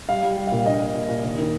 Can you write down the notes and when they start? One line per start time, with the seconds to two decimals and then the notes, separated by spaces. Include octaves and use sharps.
0.09 G3 F5
0.23 G3
0.37 G3
0.47 A#2 F5
0.66 A#1 D#5
0.80 A#3
0.95 A#2
1.09 A#2
1.24 D#2
1.38 D#3